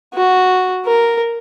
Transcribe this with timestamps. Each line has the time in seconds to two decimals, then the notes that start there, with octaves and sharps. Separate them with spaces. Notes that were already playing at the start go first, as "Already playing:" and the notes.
0.14 F#4
0.86 A#4